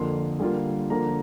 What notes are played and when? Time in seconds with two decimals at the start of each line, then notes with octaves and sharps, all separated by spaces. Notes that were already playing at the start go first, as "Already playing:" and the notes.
Already playing: F2 D3 A#3 C6
0.40 D3 G3 A#3 F4
0.90 D3 F3 A#3 A#5